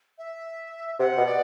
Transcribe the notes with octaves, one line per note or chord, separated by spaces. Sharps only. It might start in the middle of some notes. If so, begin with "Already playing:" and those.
E5
C3 F#5
B2
D5